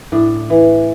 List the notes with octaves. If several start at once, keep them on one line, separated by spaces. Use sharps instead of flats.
A2 D4
E3